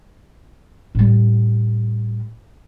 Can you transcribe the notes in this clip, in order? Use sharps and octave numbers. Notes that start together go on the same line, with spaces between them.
A2 G3